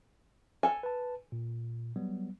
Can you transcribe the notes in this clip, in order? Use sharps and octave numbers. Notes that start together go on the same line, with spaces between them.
A4 G#5
B4 A5
A#2
F#3 G3 B3